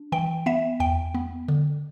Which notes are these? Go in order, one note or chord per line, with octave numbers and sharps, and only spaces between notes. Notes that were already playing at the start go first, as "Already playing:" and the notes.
Already playing: D4
E3 G5
B3 E5
E2 G5
B3
D3